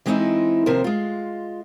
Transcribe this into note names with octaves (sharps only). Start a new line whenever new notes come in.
E3 G#3 B3 C4 D#4 E4
D#2 C3 F3 F4 A#4 C5
G#3 F4